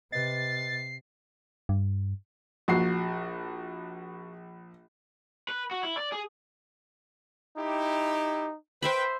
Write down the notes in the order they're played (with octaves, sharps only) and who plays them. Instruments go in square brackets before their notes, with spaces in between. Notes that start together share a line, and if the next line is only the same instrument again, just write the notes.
[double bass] C3 [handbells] B4 D#5 [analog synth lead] A6 [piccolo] C7
[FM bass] G2
[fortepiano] A#1 [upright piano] F#4 C7
[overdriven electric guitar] B4
F#4
E4
D5
G#4
[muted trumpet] D#4 [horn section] E4 G4
[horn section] B4 G5 [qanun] C5 E5 B5